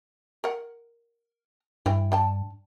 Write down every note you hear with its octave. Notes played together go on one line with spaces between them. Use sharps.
A#4 F#5
G2 E3 E4 G5
D4 G5 A5